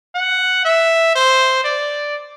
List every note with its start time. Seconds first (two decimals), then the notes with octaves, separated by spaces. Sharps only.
0.15 F#5
0.65 E5
1.15 C5
1.64 D5